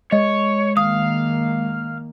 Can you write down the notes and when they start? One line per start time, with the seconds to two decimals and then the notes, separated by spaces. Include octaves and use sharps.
0.12 G#3 C#5 D#5
0.77 D#3 A#3 F5 D#6